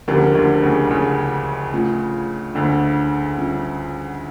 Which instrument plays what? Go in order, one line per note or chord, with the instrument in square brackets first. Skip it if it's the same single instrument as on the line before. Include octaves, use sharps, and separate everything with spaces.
[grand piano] D2 D3 [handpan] F3 C#4 G4 A#4
[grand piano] D2 D3
C#2 C#3
C#2 C#3
[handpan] A3 C#4 F4
[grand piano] D2 D3
[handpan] G3 C#4 F4